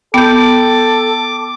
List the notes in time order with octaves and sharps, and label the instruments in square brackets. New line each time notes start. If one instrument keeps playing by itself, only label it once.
[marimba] B3 G6 [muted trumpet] A4 [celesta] G5 [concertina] D6